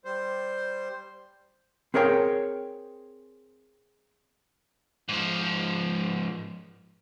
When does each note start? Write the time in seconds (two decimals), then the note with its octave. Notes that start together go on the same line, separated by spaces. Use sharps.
0.05 G3 C5
1.94 C4 G#4 A#4 C#5 E5 G5
5.09 G#2 F3